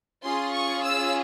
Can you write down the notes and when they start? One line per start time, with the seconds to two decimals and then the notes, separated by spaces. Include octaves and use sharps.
0.24 C#4 F4 G#4 C6
0.53 C#6
0.83 E6